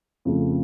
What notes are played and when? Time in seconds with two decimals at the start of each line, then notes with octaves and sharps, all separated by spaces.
0.25 F2 C#3 F3 A3